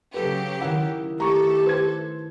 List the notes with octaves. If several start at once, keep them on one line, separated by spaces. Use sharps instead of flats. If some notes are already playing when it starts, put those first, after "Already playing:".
C#3 F#3 G4 A4 B4
D#3 E4 F#5
A3 G4 A4 A#5 C#6
B4 C5 G#6